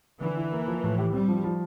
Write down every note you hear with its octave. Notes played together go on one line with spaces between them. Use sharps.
D3 E3
E4
A#3
F3
A2
G4
G3 C4
F3
F3